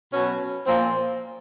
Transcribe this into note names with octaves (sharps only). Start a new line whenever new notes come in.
B2 F#3 C#4
A#2 F3 C4